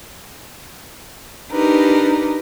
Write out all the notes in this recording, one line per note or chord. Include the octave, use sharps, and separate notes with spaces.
D4 D#4 G4 A#4 B4